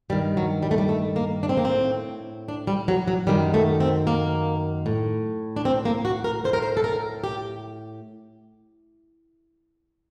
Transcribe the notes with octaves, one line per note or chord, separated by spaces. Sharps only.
G2 D#3 G3
F#3
G3
A3
G3
A3
A#3
D4
C4
A#3
A2 C4
D4
G3
F#3
F#3
F#2 D#3 G3
A3
C4
A#3
A2
D4
C4
A#3
F#4
A#4
A2 C5
A#4
C5
A4
A#4
G4